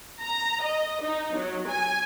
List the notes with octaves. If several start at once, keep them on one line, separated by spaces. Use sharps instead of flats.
A#5
D#5
D#4
F#3
G#5